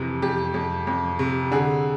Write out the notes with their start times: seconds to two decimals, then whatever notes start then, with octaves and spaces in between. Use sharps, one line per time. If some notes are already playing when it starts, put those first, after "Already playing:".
Already playing: F2 C3 E3
0.22 F2 G4
0.54 F2
0.87 F2
1.19 C3
1.51 D3 G#4